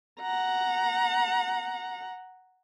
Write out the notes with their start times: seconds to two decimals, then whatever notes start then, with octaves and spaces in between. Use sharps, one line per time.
0.20 F#5 A#5